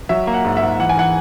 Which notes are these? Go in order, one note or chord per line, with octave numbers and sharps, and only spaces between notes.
F#3 E5
A#3
F#5
G#2
E5
G#2
E3 F#5
G#5
E3 F#5